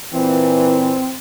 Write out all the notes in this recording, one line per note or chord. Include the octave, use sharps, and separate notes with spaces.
A#2 E3 C4